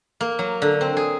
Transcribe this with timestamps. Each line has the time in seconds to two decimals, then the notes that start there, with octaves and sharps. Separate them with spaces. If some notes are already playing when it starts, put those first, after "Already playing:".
0.21 A#3
0.39 F#3
0.62 D3
0.81 C4
0.97 G#4